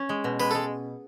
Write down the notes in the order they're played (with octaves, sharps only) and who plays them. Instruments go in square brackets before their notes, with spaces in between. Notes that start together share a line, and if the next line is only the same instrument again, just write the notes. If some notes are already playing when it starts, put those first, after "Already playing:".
Already playing: [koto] C#4
G#3
B2
[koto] G#3 [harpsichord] B4
[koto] G#3 [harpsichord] A4